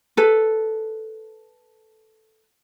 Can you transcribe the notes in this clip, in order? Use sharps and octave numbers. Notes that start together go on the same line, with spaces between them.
A4 B4